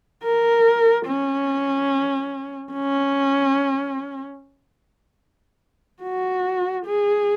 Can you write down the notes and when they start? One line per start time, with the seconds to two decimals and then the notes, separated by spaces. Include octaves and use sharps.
0.23 A#4
1.06 C#4
2.72 C#4
6.03 F#4
6.86 G#4